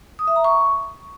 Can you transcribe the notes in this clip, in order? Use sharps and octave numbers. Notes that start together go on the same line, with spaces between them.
D#6
E5
A#5
C#6